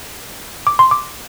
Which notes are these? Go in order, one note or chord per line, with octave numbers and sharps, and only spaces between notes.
D6
C6
D6